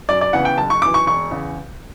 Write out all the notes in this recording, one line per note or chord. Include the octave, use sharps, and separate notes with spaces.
F#2 D5
D5
C#3 E3 B3 F#5
G5
F#1 A5
C#6
F#2 E3 D6
C#6
E1 C#6
E2 C#3